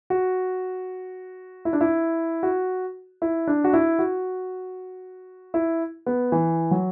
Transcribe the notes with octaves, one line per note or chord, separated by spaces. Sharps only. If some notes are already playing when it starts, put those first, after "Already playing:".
F#4
E4
D4
E4
F#4
E4
D4
F#4
E4
F#4
E4
B3
E3
F#3